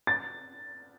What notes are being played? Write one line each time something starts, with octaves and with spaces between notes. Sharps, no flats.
A6